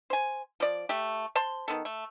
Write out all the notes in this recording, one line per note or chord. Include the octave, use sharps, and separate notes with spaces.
C5 G#5
F3 D5
A3 G4
C5 A5 C6
D#3 B3 A4
A3